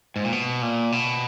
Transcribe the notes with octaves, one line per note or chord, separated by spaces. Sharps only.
G#2
A#2
B2
A#2
B2